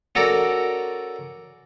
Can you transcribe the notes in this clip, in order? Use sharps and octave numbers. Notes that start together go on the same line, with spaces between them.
C#4 F#4 A4 A#4 D5